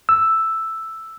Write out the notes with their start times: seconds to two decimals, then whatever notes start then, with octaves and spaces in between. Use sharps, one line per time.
0.09 E6